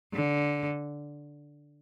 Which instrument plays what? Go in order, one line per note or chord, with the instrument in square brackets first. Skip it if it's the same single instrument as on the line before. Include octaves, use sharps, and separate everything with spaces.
[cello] D3